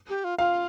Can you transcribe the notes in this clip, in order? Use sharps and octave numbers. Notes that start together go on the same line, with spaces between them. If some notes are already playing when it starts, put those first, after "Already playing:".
G4
F4
F4 F5